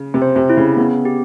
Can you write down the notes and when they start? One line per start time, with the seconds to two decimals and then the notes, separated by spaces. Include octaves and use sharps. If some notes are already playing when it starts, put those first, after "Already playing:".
Already playing: C#3
0.14 C3
0.22 C5
0.36 C3
0.50 E4
0.57 C#3
0.77 C#3 B3
1.05 G4